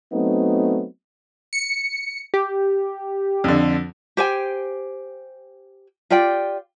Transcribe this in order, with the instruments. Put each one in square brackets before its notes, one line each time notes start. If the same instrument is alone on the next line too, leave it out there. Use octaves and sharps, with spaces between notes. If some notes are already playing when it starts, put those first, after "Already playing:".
[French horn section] F#3 A3 B3 C4 D#4
[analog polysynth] C#7
G4
[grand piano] F2 D3
[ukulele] G4 C5 G5 G#5
F4 G4 D5 G5